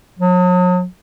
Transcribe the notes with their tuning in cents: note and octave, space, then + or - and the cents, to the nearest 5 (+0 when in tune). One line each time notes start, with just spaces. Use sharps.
F#3 -40